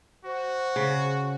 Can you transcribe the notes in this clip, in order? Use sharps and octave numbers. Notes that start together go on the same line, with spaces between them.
F#4 C5
C#3